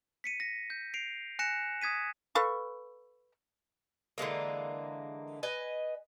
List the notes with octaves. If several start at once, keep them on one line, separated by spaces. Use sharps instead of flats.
B6 C#7 D#7
A#6
G6
C7 D7 F7
G#5 F#6 A#6 C#7 E7
D#6 G#6 B6 D#7
A4 B4 F5 C#6
D3 E3 G#3 A#3
B4 D#5 G#5